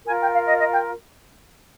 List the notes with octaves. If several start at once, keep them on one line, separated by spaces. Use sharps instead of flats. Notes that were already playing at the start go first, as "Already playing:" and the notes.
F4 A#4 G#5
G5
F5
D#5
D#5
G5